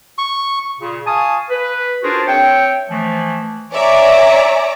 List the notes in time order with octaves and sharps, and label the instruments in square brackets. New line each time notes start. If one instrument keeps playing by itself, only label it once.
[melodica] C#6
[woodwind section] A#2 C#3
F5 G#5 A5 C#6 D#6
B4
D4 F4 F#4 G#4 A#4 C5
C4 C#5 E5 G5
E3 F3 A3
[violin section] C#5 D5 E5 G#5 A#5 D6